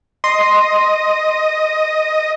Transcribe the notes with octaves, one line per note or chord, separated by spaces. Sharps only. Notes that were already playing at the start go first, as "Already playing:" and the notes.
D#5 C6